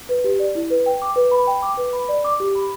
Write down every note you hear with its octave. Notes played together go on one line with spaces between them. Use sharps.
B4
G4
D5
E4
B4
G5
D6
B4
B5
G5
D6
B4
B5
D5
D6
G4
B5